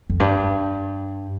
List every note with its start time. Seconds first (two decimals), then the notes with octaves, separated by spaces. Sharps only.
0.10 F2
0.20 G2